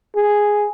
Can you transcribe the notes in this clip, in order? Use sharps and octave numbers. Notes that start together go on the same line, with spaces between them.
G#4